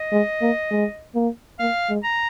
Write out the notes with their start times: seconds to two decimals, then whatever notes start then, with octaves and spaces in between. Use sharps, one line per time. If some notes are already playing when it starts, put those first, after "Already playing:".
Already playing: D#5
0.12 G#3
0.41 A#3
0.71 G#3
1.15 A#3
1.59 A#3 F5
1.89 G#3
2.03 A#5